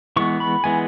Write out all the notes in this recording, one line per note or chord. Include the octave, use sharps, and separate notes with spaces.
E3 G#3 B3 C#6
B5
E3 G#3 B3 G#5